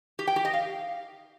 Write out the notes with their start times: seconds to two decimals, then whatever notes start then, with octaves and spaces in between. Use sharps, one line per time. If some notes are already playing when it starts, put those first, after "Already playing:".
0.19 G4
0.27 G5
0.36 G4
0.45 D#5
0.53 F5